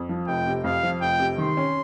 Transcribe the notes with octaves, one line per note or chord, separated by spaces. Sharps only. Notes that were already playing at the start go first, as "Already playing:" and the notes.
Already playing: F2
F3
F1 G5
C3
F2 F5
F3
F1 G5
C3
D#3 C6
C#4